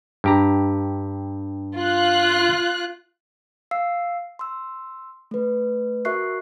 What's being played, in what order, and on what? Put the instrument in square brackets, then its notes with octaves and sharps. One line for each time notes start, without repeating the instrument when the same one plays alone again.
[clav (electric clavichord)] G2 G4 A#5
[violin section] F4 F#6
[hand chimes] F5 E6 C7
C6 E6
A3 B4
F#4 A#4 E5 C#6 F#6 C7